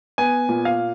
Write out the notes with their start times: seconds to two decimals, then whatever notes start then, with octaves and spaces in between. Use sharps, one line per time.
0.18 B3 G#5
0.49 A#2
0.65 F5